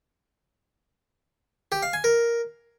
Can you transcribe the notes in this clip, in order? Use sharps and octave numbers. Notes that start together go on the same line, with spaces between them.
G4
F5
G#5
A#4